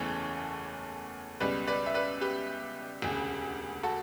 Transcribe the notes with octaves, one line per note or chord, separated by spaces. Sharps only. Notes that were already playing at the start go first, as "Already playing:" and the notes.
Already playing: F#1 E2 C#3 E3 A3 A4 C#5
C#2 B2 G3 B4 D5
B4 D5
E5
B4 D5
G4 B4
E1 D2 C#3
F#4 A4